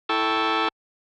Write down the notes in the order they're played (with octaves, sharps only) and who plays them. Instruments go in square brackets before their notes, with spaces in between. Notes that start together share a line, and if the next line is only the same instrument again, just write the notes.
[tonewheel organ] E4 A4 G5 A5 C#6 E6